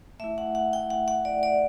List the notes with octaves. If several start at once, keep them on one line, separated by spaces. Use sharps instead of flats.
A3 E4 E5
F#5
F#5
G5
F#5
F#5
D5
D5